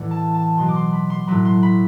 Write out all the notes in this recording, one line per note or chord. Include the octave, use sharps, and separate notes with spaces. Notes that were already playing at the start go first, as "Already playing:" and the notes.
Already playing: A2 E3 D5 F#5
A5
A5
B2 F#3 C6
D6
C6
B5
C6
A2 F#3 B5
C6
B5